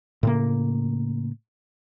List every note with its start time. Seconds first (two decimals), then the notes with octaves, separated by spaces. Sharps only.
0.23 A2 C#3 A#3